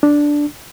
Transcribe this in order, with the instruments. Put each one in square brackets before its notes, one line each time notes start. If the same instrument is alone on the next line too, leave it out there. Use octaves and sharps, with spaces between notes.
[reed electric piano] D4